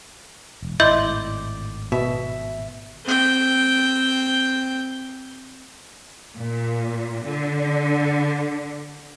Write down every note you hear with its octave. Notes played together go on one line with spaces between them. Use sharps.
E1
G#1 A2 E4 D5 D#5 C6 G6 F#7
B2 E5
C4 G5
A#2
D3